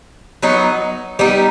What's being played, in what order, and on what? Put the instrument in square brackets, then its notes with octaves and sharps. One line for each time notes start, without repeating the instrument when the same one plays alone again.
[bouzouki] F#3 B3 D#4
G3 B3 D#4